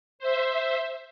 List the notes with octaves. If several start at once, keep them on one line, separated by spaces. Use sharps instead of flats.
C5 E5